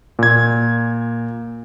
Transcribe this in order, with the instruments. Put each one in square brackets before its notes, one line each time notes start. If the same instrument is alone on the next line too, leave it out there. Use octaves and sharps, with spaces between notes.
[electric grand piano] A#2 G#6